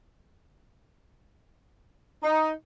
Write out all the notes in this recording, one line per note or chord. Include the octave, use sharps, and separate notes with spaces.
D#4